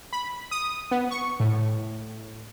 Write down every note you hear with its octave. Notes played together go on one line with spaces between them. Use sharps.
B5
D#6
B3
C#6
A2